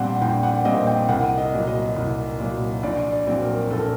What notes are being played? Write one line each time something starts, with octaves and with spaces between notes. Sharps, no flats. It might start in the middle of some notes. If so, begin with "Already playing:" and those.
Already playing: A#1 A#2 G3 C4 C5 F#5
A#1 G5
F#5
A#2 G3 C4 D#5
G5
C2 F#5
D#5
A#2 F#3
D#5
C2
A#2 F#3
A#1 D5
D5
A#2 F#3 C4
A#4
A#1 A4
A#4